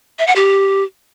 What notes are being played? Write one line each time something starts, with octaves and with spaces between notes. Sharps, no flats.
E5
F#5
G4